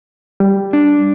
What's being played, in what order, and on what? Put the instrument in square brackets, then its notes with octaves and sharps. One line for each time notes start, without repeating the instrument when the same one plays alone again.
[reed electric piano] G3
[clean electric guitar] D4